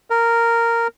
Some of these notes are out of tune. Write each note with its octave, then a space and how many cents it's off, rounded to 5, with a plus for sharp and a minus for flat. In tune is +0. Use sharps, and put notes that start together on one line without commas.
A#4 -10